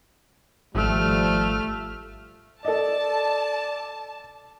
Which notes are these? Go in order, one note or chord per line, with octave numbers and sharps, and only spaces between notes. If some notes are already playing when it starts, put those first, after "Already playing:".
G#1 F3 G3 A3 F6
A4 D5 D#5 A5